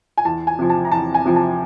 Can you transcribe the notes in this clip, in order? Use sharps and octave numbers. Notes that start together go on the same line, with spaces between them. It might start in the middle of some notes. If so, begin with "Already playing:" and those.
G#5
E2 A5
G#5
C3 F3
A5
A#5
E2 A5
G#5
C3 F3
A5